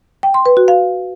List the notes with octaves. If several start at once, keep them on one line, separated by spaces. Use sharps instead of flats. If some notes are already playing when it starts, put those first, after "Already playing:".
G5
C6
B4
F#4
F5